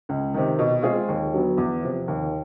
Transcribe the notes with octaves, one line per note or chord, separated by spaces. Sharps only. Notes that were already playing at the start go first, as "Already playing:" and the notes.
C#2
C3 D#3
B2
G#3 C4 F4 G#4
D#2
D3 F#3 B3
E2
C3 F3
D#2